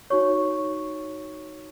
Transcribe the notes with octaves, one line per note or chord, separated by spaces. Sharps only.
D#4 F#4 C#5 C#6